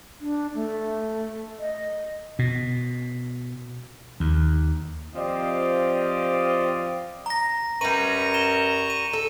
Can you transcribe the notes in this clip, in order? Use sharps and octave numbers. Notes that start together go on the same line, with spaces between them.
D4
A3
D#5
B2
D#2
F3 C4 F4 G4 D5 D#5
A#5 A#6
F#2 G3 B4 A#5 C#6 D#7
E7 G7
D#7
A4